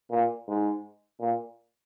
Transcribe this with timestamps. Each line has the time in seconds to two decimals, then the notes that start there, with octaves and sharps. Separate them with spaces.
0.11 A#2
0.48 G#2
1.20 A#2